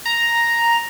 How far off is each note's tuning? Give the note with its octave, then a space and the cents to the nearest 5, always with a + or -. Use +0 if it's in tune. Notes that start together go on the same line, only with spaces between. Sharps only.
A#5 +0